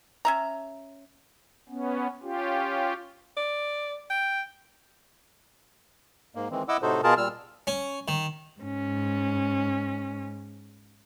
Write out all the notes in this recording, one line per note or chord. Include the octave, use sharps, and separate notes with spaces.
C#4 E5 A#5
B3 C#4
C#4 F4 G4
D5
G5
G#2 A#3
D#3 E3 G#3 C4
E4 D#5 F#5 D6 E6
A2 C3 D#4 F#4 A4 C5
B2 F4 G#4 A#4 A5
A#2 G3 E6 F6
C#4
D#3
G#2 C#4